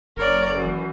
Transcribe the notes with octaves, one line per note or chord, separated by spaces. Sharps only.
F#1 A#4 C#5 D5
F#2 E3